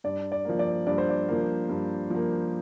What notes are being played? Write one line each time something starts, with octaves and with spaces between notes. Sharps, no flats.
G2 D5
D5
F3 A#3
D5
G2 D5
C5
D5
F3 A#3
G2
F3 A#3